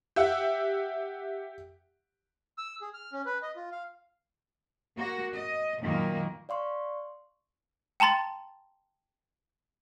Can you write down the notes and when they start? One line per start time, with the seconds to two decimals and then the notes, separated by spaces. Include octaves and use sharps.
0.16 G4 E5 F#5
2.58 E6
2.82 G#4
2.94 F6
3.13 C#4
3.26 B4
3.42 D#5
3.56 F4
3.72 F5
4.95 A#3 F#4
5.33 D#5
5.80 F#2 A#2 D#3 A#3
6.49 D5 F5 C6 C#6
8.00 G5 A5 A#5 C6 A6